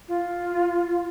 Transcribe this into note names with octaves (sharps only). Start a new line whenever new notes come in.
F4